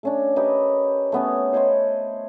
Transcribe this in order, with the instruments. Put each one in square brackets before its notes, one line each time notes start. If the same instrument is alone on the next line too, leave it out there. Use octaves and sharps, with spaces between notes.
[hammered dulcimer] A3 C#4 D4
G4 A#4 B4 D#5
A3 B3 C#4
C5 C#5 D#5 C6